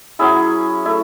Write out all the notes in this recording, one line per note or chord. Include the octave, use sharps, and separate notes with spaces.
F#3 C#4 E4 G#4
A3 E4